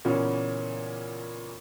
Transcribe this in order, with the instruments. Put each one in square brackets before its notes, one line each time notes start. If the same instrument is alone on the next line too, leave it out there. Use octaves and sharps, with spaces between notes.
[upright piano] A#2 C#3 E3 A#3 B3 C#4